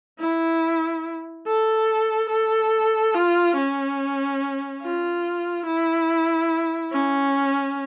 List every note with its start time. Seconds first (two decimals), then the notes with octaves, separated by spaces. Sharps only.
0.20 E4
1.46 A4
2.30 A4
3.15 F4
3.56 C#4
4.82 F4
5.66 E4
6.92 C#4